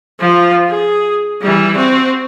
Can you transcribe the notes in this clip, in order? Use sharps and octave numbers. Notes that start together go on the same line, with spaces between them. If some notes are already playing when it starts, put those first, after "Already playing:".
F3 F4
G#4
E3 G3
C4 F#4